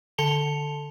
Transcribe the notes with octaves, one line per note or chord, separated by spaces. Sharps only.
D3 A4 A5 C#7 F7 G7